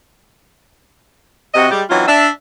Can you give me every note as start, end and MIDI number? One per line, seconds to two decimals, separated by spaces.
1.55 1.70 48
1.55 1.70 66
1.55 1.70 75
1.70 1.82 55
1.70 1.82 56
1.70 1.82 67
1.90 2.04 52
1.90 2.04 54
1.90 2.04 60
1.90 2.04 61
1.90 2.04 63
1.90 2.04 65
2.08 2.28 62
2.08 2.28 76